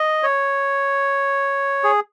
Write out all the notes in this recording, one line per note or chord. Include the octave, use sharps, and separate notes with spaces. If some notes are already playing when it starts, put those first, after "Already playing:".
Already playing: D#5
C#5
G#4